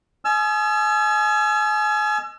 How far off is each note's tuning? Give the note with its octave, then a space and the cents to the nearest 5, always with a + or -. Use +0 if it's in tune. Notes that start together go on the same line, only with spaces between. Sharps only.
D#5 +0 G#5 +35 E6 +40